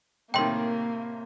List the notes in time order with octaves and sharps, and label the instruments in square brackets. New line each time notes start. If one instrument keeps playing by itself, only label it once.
[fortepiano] A2 C3 D#3 [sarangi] A#3 [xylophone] G5 C6